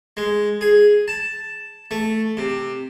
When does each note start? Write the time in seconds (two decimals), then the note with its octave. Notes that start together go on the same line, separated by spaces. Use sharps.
0.17 G#3
0.61 G#4
1.08 A5
1.91 A3
2.37 C3